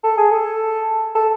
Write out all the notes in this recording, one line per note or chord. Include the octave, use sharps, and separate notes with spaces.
A4
G#4
A4
A4